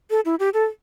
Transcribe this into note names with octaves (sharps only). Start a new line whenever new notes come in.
A4
E4
G4
A4